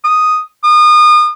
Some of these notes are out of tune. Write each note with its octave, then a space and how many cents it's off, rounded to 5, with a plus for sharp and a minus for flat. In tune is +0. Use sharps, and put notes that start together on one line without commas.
D#6 +0
D#6 -35